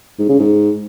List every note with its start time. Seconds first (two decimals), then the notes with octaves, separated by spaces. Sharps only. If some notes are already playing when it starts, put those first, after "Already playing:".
0.19 G#2
0.29 C#3
0.39 G#2